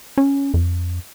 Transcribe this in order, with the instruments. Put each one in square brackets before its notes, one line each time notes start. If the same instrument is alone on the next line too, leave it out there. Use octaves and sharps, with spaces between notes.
[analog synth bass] C#4
F2